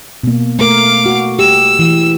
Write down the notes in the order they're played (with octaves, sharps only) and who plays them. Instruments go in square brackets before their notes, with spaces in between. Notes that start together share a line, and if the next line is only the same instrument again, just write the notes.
[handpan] B2 A#3
[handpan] A3 A#4 [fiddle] F5 D6
[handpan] F#4
[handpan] G4 [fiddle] E6
[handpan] E3